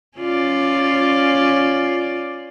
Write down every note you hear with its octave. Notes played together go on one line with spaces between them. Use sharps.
C#4 F4 D5